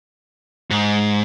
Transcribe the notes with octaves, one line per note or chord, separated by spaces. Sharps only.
G#2